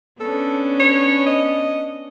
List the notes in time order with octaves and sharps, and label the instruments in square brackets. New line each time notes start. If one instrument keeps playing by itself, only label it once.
[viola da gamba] B3 C#4 D4 [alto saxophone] A4
[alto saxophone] C#5
D#5